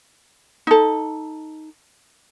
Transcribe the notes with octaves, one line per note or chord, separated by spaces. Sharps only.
D#4 A4